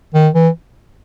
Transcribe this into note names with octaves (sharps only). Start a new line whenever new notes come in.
D#3
E3